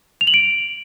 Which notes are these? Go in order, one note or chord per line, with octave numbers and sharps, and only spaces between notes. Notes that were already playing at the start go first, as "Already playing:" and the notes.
F7
F#7
D7